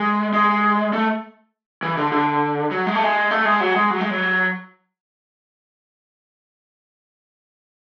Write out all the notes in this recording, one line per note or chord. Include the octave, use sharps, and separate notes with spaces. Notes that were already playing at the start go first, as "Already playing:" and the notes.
Already playing: G#3
G#3
A3
E3
D3
D3
F#3
G#3
A3
G#3
A3
G#3
F#3
G#3
F#3
G#3
F#3